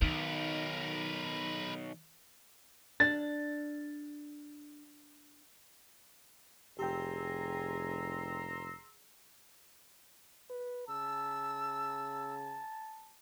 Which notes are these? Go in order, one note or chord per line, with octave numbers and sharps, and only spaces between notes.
B1 D#3 A#4 B4
D4 A6
F1 G4 G#4 G5 A#5 C6 E6
B4
C#3 A5 E6